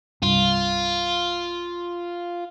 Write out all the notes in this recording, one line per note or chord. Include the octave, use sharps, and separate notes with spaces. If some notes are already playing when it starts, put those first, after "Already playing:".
C2 G2 F4